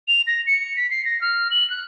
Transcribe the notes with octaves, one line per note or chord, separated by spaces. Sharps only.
F7
A#6
C#7
B6
C7
A#6
F6
F#7
F#6